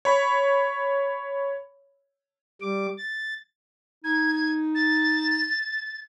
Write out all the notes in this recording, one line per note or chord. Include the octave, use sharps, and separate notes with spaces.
C#5 B5
G3 D6
A6
D#4 G#6
A6